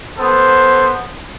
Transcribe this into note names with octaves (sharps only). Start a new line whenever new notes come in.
B3 A4 C5